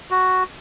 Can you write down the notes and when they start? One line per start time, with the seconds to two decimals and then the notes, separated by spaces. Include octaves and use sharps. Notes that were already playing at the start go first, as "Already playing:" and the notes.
0.11 F#4